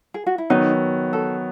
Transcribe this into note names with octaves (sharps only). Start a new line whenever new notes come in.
G#4
F#4
E4
D#3 F#3 B3 D#4
A4